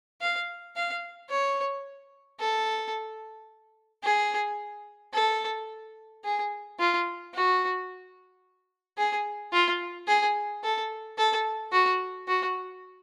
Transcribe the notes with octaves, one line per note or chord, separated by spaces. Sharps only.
F5
F5
C#5
A4
G#4
A4
G#4
F4
F#4
G#4
F4
G#4
A4
A4
F#4
F#4